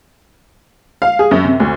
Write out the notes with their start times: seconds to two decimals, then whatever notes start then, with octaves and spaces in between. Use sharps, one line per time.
1.02 F5
1.19 G#4
1.31 F#2
1.45 C3
1.60 D2